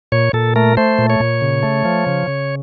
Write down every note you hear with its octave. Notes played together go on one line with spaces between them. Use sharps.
A#2 C#5
A#2 A4
A3 A#4
A3 C5
A#2
C#5
A#2
C#3
A3
F3
C#3
C#3